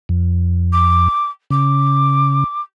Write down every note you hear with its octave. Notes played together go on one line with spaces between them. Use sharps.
F2
D6
C#3 D6